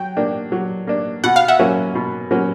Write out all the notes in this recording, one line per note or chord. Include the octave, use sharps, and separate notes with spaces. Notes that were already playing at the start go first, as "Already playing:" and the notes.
Already playing: F#3 G5
A#3 D4
F#3
A#3 D4
B2 F#5
F5
E5 F#5
F#3 A#3 C#4
B2
F#3 A#3 C#4